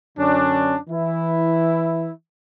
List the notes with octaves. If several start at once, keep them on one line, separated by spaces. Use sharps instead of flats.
F#2 D3 C#4 D4
E3 E4